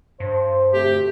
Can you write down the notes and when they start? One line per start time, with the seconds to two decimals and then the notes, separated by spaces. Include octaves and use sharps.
0.20 G2 C5
0.73 D2 C3 A3 G4